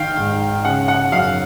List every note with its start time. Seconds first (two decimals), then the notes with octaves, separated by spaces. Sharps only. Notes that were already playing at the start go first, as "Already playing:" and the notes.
Already playing: D#3 F5 G5
0.18 G#2
0.64 C#3 F#5
0.88 F#5
1.12 F#2 F5